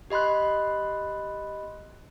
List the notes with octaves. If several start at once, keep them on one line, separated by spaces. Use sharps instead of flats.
G4 D#5 B5 C6 F#6